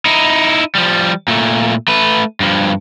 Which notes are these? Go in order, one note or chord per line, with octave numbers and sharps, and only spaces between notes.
D#4 E4
F3 G3
A#2 A3
A3 B4
G2 F3